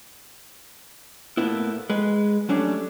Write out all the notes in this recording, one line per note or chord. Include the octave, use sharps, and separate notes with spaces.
A2 A#3 B3 E4
G#3 B4
F#3 G3 A3 C#4 D4